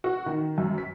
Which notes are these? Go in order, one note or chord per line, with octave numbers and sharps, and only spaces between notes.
F#4
D#3
F#2
B6